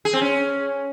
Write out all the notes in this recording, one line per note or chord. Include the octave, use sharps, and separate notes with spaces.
G#4
C4
C#4